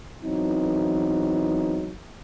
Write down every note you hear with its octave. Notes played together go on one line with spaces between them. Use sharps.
E2 E3 F#3 C4 D#4